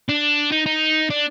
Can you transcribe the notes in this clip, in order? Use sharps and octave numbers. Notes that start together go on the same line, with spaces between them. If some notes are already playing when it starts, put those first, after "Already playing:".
D4
D#4
D#4
D4